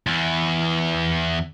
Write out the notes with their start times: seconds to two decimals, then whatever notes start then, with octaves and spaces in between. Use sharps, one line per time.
0.07 E2 E3